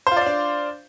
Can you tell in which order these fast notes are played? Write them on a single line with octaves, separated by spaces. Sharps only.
C5 F4 D5 F5 D4